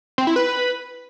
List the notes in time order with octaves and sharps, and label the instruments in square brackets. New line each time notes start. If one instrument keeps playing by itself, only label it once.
[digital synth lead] C4
E4
B4